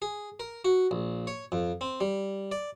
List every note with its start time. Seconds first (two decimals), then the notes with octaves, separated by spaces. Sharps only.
0.02 G#4
0.40 A#4
0.65 F#4
0.91 A#1
1.27 C#5
1.52 F2
1.81 C4
2.01 G3
2.52 D5